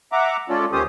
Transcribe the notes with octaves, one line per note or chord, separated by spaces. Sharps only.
E5 F#5 A#5 D6
G#3 C#4 F4 A4 D5
D#2 D#3 C#4 G4 C5 D#6